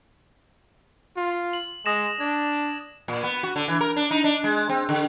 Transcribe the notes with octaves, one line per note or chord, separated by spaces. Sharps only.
F4
F#7
G#3 D#6 A#6 E7
D4 G#6
A#2
B3
F#4
D3
E3
A#4
D4
D#4
D4
G#3
C4
D3